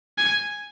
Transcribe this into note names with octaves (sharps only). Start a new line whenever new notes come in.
G#5